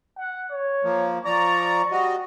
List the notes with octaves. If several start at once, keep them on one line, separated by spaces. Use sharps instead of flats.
F#5
C#5
F3 A#3
F3 D5 A#5 C#6
G3 F#4 D#5